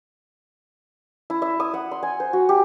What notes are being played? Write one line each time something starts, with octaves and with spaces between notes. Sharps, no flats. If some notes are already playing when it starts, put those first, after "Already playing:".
E4
E5
D#6
F#5
C6
G#5
C5
F#4
G4